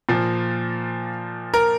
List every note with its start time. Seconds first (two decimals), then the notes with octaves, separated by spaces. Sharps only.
0.09 A#2 F3
1.54 A#4